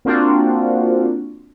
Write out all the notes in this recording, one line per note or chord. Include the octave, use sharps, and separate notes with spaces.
A#3 C4 D4 F4 F#4